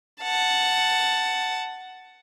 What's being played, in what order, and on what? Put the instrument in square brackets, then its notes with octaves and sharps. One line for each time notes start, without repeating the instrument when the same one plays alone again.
[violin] F#5 A5